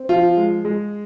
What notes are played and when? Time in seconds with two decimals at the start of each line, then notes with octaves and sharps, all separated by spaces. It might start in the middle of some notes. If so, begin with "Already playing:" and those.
Already playing: C4
0.09 F3 F4
0.37 G#3
0.65 G#3